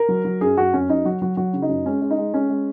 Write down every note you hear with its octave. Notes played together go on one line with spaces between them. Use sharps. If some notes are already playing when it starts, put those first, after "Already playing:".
Already playing: A#4
F#3
F#3
F#2 G#4
F#2 F#4
F#2 C#4
F#2 D#4
F#3 F#4
F#3 F#4
F#3 F#4
C#3
D#4
F#2
G#3 C#4
G#3
D#4
G#3
G#3 C#4
G#3